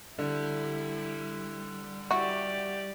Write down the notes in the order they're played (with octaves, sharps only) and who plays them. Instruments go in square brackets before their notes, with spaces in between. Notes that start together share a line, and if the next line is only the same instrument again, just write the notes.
[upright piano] D3 [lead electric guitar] G3 [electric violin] E4
[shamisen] E4 F#4 [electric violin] G4 D5